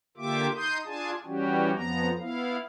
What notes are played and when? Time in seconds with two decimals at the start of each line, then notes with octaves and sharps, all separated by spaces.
0.17 D3 A#3 F4 G4 E5 D6
0.55 D#4 C6 D#6 G6
0.85 D4 F4 G#4 G#5 A5
1.25 E3 G3 C#4 F#4 G4
1.75 F2 F3 B3 A#5
2.20 B3 E4 F5